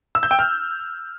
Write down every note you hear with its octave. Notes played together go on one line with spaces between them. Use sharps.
E6
G6
G5
F6